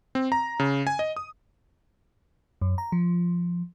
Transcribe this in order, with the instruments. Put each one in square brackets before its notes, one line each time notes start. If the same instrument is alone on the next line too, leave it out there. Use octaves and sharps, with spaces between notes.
[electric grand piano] C4
A#5
C#3
G#5
D#5
D#6
[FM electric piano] F#2
A#5
F3